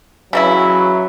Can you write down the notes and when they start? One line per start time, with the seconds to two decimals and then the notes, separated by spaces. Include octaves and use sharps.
0.33 C#3 E3 F#3 E4